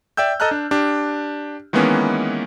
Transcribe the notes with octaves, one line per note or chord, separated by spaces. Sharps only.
D5 E5 G5 E6 G6
A4 D#5 A5 A#5 F6 F#6
D4
D4 G4
D#3 E3 G#3 A#3 B3 C#4